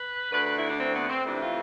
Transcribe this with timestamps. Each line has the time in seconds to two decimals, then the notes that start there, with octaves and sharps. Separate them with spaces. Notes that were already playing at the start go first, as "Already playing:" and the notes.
Already playing: B4
0.32 D2 D3 A3 B4
0.44 B4
0.56 E4
0.67 D4
0.78 C4
0.94 B3
1.09 C4
1.24 F2 C3 E3 A3 D4
1.40 F4